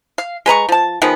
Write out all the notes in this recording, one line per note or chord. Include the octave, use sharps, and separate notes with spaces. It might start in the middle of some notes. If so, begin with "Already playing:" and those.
F5
G#3 B4 A#5 C#6
F3 A5
D#3 F3 G#3 B3